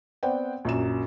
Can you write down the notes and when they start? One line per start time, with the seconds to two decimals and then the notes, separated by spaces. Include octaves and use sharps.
0.23 B3 C4 C5 D5 F#5 G5
0.65 A#1 F#2 E7